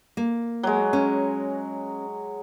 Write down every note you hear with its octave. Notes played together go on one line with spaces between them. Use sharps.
A#3
F#3 G#3
C#4